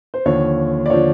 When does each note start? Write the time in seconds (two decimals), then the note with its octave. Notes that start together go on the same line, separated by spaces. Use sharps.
0.14 C5
0.25 D#2 D3 F3 C#5
0.86 D5
0.90 D3 F3 C#5